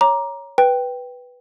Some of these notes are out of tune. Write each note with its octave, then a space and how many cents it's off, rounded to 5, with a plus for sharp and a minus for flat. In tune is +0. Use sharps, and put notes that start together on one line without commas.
C#5 +0 A#5 +15 D6 +0
B4 +0 G5 +0